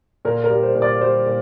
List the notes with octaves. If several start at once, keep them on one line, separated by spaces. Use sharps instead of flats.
A#2 A#4
A#4
G3
C5
A#2
D5
G3 C5
A#2